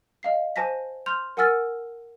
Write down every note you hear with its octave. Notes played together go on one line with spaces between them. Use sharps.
D#5 F5 C7
C5 G#5 A5 A#6 B6
C6 F6 G6 F7
A#4 F#5 G#5 E6 F6 A6